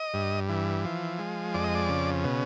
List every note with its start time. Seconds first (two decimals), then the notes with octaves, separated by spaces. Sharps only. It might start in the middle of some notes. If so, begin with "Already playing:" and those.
Already playing: D#5
0.14 G2
0.49 E3
0.85 F3
1.19 G#3
1.54 F2 D5
1.64 D#5
1.75 D5
1.89 C#3
2.24 B2